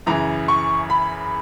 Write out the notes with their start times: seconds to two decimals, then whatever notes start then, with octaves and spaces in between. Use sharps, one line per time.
0.06 F#2 C#3 E3 A#5
0.48 C#6
0.90 B5